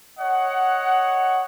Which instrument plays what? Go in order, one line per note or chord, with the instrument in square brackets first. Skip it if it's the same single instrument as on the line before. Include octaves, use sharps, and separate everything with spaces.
[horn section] C#5 D#5 F#5